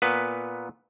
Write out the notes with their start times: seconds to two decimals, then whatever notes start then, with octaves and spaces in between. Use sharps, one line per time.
0.02 A#2 B3 B4